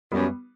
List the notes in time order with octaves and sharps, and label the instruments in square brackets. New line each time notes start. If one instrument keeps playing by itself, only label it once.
[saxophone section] F#2 [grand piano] G3 B3